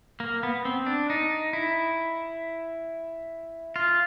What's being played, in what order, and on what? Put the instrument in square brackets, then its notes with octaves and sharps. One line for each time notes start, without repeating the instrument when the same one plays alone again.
[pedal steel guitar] A#3
B3
C4
D4
D#4
E4
F4